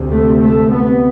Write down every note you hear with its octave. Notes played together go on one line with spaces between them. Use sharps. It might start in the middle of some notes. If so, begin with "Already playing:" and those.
Already playing: D2 C3
A3
A3
B3